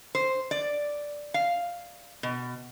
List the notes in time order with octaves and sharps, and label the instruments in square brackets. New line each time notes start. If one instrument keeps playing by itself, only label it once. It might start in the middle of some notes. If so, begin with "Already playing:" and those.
[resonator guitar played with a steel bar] C5
D5
F5
B2